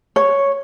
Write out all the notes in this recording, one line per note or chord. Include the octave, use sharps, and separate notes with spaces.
C#5